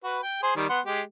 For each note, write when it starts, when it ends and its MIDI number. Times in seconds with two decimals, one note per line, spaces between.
0.04 0.19 66
0.04 0.19 71
0.23 0.41 79
0.43 0.53 68
0.43 0.53 72
0.56 0.69 51
0.56 0.69 55
0.70 0.80 59
0.70 0.80 78
0.70 0.80 84
0.86 1.01 56
0.86 1.01 67